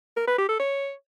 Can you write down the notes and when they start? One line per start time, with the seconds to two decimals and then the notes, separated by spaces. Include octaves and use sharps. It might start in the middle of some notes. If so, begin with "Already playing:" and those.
0.17 A#4
0.27 B4
0.38 G4
0.49 A4
0.59 C#5